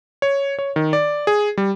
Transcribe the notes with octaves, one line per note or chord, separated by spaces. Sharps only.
C#5
C#5
D#3
D5
G#4
G3